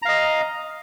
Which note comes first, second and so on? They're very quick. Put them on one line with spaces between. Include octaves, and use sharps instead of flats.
A#5 F5 D#5